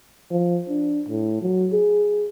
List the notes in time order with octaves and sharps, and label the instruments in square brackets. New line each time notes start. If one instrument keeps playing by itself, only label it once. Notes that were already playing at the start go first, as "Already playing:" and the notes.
[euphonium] F3
D4
A2
F#3
G#4